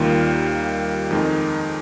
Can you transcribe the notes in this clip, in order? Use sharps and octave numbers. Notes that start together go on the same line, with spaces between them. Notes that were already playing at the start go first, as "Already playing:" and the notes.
Already playing: D#2 D#3 G3 A#3 F4
F2 D#3 G#3 D#4